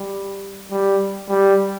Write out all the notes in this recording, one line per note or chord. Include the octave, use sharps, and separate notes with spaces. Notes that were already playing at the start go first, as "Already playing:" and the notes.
Already playing: G3
G3
G3